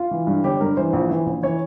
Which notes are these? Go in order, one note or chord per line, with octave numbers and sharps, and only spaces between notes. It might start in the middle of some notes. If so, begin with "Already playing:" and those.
Already playing: F4
E3
G2
G1 G4
G2 A#4
E3 C5
A#1
E3
A#1
E3 C#5